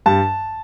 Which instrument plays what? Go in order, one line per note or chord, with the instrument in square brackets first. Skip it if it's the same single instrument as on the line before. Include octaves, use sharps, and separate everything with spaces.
[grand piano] G2 A5